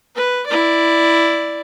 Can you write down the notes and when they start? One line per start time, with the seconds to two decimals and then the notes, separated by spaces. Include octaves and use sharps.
0.16 B4
0.47 E4 D5